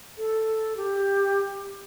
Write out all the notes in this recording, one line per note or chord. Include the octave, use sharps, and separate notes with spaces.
A4
G4